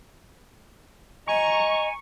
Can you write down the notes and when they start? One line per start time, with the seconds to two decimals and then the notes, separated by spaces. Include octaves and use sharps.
1.28 D#5 G#5 A#5 C#6